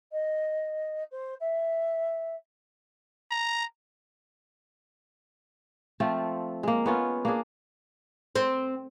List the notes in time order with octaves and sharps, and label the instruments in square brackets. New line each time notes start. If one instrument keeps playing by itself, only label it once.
[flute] D#5
C5
E5
[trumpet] A#5
[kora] F3 A3 C4 F4
G#3 A#3
B3 C#4 F4 B4
A#3 D4 G#4
[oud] C4